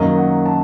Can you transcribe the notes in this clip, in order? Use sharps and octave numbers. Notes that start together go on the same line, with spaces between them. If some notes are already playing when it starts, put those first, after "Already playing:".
Already playing: F#2 D#3 F#3 A#3 D#5
F#5
A5